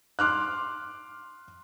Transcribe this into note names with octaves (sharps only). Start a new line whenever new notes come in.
C6 D6 F6 F#6